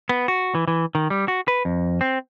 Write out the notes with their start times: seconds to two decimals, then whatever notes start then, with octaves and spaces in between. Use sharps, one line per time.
0.09 B3
0.28 F#4
0.55 E3
0.68 E3
0.95 D#3
1.10 G3
1.28 F#4
1.48 B4
1.65 F2
2.01 C4